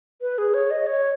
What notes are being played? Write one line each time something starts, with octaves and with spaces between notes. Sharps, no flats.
B4
G#4
C#5
D#5
C#5